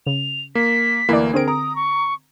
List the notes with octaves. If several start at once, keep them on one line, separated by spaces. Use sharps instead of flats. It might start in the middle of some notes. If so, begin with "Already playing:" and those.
C#3 F7
A#3 B6
D2 E3 A#3 E4 D5
D3 C4 G#4 A#4 D7
A#5 D#6
C#6